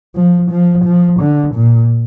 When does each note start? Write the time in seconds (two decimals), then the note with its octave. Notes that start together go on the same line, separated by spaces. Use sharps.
0.15 F3
0.51 F3
0.84 F3
1.20 D3
1.55 A#2